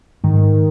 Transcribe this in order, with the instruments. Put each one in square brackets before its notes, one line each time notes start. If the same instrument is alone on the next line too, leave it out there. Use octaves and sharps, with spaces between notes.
[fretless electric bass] G#2 [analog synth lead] D#3